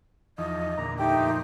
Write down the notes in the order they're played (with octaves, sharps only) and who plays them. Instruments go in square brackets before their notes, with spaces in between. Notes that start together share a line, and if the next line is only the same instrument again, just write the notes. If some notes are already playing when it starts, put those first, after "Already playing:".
[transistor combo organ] E2 F3 D#4 [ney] D#5
[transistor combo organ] E2 A#2 D3 [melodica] A#5
[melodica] A3 G4 G5 [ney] D#4
[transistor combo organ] F2 A#2 C5